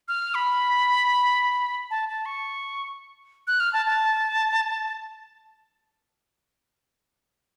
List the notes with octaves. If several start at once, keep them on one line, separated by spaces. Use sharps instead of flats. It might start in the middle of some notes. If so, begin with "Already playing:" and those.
F6
B5
A5
A5
C#6
F#6
F6
A5
A5